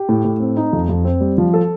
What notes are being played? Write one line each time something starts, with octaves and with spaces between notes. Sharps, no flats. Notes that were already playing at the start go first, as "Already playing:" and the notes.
Already playing: G4
A2
A2
C4
D#4
F2
F2
C4
G3
F3
A4